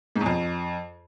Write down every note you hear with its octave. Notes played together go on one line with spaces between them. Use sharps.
G#2
E2
F2